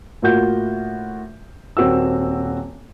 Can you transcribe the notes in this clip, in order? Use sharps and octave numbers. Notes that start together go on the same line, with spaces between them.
A2 A#3 F4 F#4 G6
D#1 A#3 C4 F#4 E6